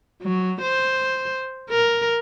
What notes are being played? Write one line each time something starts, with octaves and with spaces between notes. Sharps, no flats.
F#3
C5
A#4